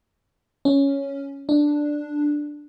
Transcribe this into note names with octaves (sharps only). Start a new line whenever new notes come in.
C#4
D4